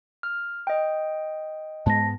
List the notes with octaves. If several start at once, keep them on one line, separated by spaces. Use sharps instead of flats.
F6
D#5 G5
G#2 G#3 B3 A5 A#6